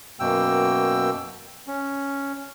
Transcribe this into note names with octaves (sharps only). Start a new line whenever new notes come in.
F#2 B2 A#3 G5 E6
C#4